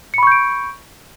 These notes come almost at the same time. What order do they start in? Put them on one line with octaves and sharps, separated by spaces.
C#7 B5 C#6 G6 D7